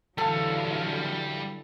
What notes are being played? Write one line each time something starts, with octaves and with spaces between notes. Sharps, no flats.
D3 E3 F#3 G3 A4 F5